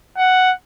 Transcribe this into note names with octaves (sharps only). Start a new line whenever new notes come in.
F#5